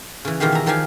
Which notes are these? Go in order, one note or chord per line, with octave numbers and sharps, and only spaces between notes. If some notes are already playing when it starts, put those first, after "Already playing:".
C#3 E3
B2 D#3 E3 G#3 G4 F5
E5 A#5
D#3 F3 D#4 G4 F5 G#5